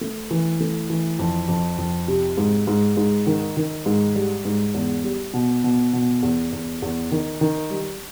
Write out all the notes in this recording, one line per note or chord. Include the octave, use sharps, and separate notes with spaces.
A3
E3
A3
E3
F2
F2
F2
C3
G#2
G#2
G#2
D#3
D#3
G#2
G3
G#2
E2
G3
B2
B2
B2
E2
E2
E2
D#3
D#3
G3